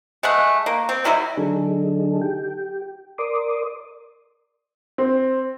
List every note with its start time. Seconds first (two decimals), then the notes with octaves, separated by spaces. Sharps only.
0.23 G#3 A3 F#5
0.66 A#3
0.89 C4
1.04 D#3 F#3 G3 E4
1.37 D3 F#3 D4 D#4 G#4 A4
2.22 G4 G5
3.18 A#4 D5 C6 D6 D#6
4.98 C4